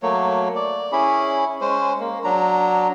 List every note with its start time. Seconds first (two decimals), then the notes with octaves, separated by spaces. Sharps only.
0.03 F#3 A3 A#3 C#5
0.55 D5
0.92 C#4 E4 G#4 B5
1.61 G#3 C#4 C5
2.00 A#3
2.24 F#3 D4 A#5